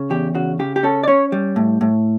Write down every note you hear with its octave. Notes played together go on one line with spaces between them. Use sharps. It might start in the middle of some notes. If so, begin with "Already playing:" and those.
Already playing: C#3
E2 G4
C#3 F#4
C#3 G4
G4
C#4 A4
D5
C#4 C#5
G3
A2
A2